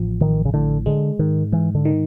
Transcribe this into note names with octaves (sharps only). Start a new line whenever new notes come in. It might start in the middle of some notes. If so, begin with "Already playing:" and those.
Already playing: A1 F3
A1 D#3
C#3
A2 D3
D3 G#3
G#2 D#3
G#2 E3
D3
D#3